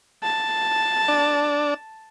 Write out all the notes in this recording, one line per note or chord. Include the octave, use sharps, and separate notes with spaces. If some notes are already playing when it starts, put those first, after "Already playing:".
A5
D4